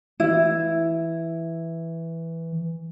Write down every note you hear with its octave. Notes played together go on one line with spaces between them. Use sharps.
E3 E4